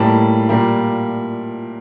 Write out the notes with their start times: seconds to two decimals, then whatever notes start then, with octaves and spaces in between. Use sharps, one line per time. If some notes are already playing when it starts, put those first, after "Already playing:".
Already playing: A2 G3 A#3 A5
0.49 A#2 G3 A#3